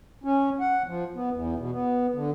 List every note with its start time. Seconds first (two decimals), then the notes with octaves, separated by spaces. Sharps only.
0.24 C#4
0.60 F#5
0.86 F3
1.15 B3
1.33 E2
1.58 B2
1.71 B3
2.14 D3